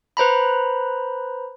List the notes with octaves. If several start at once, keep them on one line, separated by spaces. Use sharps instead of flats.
B4 C5 A#5 B5